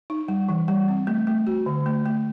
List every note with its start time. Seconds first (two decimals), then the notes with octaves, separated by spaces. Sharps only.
0.10 D#4
0.28 G3
0.49 E3
0.68 G3
0.88 C4
1.07 A3
1.27 A3
1.47 F#4
1.66 D3
1.86 A3
2.06 A3